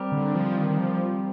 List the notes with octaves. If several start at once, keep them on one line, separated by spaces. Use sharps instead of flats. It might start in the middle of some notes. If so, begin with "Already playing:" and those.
Already playing: G3 C4 G4 A#4
D3
F3
D#3
D#3
F3